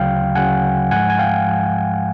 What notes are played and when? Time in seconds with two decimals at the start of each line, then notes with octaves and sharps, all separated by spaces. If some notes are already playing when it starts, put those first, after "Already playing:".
Already playing: D2 C#3 F#3 F5 G5
0.35 D2 C#3 F#3 F#5 G#5
0.91 G#2 F3 G#3 F#5 G#5
1.10 G#5
1.19 F5 G5
1.47 G#2 F3 G#3